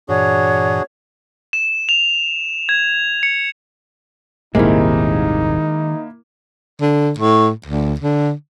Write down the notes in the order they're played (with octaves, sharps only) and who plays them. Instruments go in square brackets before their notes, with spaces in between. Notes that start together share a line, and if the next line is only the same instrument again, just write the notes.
[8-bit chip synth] G2 A#2 E3 [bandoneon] D4 F#4 G#4 [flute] C#5
[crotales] E7
F7
G#6
C#7
[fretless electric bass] D#1 G#1 C3 [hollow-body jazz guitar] D#3 G#3 [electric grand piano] A#3 E4 [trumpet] D#4
[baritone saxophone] D3
A2
D2
D3